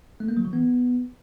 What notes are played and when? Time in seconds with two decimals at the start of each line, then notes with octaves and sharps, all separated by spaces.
0.20 A3
0.28 A#3
0.37 F#3
0.45 E3
0.53 B3